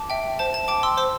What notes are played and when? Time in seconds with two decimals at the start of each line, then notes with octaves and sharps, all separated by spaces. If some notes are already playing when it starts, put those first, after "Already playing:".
Already playing: A5 D6
0.10 E5 G5
0.39 C5 A5
0.54 A5
0.68 G5 A5 D6
0.83 C6 E6
0.97 C5 C6 E6